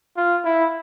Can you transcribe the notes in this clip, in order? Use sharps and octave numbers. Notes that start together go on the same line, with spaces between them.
F4
E4